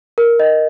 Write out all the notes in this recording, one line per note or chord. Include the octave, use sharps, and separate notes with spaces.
A#4
D#5